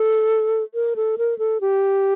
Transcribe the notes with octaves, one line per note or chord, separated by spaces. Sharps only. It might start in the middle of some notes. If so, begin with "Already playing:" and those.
Already playing: A4
A#4
A4
A#4
A4
G4